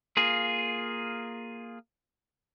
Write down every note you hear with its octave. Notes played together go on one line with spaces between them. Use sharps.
A#3 F4 G#4